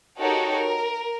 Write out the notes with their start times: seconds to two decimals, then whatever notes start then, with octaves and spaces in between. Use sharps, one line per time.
0.18 D#4 F#4 G4 A4 A#4 C#5
0.54 A#4